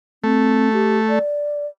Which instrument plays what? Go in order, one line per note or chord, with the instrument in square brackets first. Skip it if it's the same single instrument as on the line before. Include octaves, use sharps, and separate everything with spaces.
[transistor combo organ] A3 [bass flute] C4
[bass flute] G4
D5